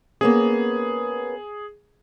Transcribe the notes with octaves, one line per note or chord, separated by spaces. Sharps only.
A#3 B3 C#4 G#4